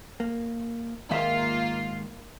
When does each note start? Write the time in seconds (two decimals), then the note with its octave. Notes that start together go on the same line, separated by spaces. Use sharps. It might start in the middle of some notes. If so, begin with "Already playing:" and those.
0.20 A#3
1.11 G#2 D#3 A#3 F4 E5